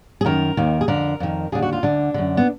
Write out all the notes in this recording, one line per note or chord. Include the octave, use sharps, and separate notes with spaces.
G#4
F#2 D#3 A#4
D#2 D#3
G#4
F2 D3 A#4
F2 D#3
D#2 D3 G#4
F#4
F4
D2 D3 D4
F#2 D3
B3